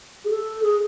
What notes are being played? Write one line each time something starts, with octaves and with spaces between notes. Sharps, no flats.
G#4
A4
G#4